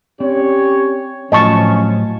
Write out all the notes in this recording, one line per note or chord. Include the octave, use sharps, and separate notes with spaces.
C4 C#4 G4 C#5 D5
A2 F3 F#3 C#4 D#5 A5 C#6